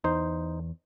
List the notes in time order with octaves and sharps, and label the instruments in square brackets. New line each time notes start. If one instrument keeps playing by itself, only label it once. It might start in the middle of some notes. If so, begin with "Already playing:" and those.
[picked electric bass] E2 [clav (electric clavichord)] D#4 C5